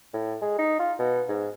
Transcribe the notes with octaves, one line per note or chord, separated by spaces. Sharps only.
A2
G#3
D#4
F4
B2
G#2